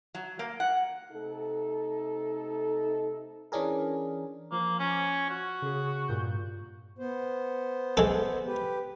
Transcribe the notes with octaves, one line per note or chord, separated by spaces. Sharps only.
F#3
A#3
F#5
C3 A3 D#4 A4
E3 C#4 D4 G#4 A#4
F3 A#3
C#4
F#4
C#3 G#4
G2 A#2 G6
B3 C5
G#3 A4
G4 B4